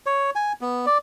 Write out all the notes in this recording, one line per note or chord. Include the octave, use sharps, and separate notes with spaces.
C#5
G#5
B3
D5